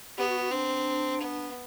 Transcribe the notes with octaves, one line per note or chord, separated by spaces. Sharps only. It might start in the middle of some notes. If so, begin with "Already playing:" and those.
B3 G4
F#4
F#4
C4 D4
B3